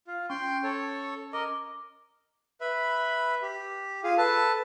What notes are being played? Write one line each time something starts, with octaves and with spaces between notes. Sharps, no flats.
F4
C#4 G5 C6
A4 C#5
A#4 D#5 D6
B4 E5 B5
G4
F4 G#4 F5
A4 B4 A5